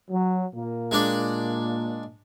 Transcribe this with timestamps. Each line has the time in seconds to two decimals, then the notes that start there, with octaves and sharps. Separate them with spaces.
0.11 F#3
0.55 A#2 A#3
0.91 G#3 D4 D5